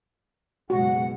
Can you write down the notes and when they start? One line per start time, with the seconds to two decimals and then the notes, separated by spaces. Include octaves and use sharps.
0.70 F#1 B2 G#3 F#4 F#5